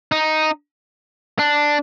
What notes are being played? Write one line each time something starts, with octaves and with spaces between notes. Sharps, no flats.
D#4
D4